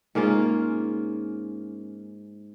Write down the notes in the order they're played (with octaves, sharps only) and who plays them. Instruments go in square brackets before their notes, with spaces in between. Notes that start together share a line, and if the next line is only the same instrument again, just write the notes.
[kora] G#2 A#3 C#4 F4